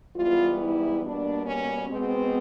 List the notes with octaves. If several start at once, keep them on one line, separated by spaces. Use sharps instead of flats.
G#2 E3 G3 B3 F4
E4
B2 G3 A#3 D4
C#4
B2 G#3 B3 C4